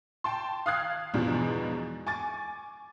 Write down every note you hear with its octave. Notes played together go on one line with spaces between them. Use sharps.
G5 A5 C6
F5 D#6 F6 F#6 G#6 C7
E2 G#2 B2 F3 G#3 D4
G#5 C#6 D6 A6